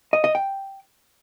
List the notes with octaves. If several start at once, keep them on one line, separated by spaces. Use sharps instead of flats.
D#5
D#5
G5